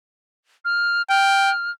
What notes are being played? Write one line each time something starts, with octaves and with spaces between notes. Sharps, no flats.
F6
G5 F6